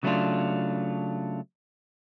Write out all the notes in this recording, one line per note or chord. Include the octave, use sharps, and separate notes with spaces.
C#3 F#3 A3 B3 D4 F4